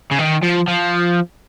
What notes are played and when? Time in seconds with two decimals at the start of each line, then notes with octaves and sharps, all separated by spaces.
0.11 C#3
0.19 D#3
0.42 F3
0.68 F3